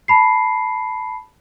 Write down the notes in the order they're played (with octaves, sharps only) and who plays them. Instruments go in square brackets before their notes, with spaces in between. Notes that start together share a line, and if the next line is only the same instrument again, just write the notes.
[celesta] A5 B5 C7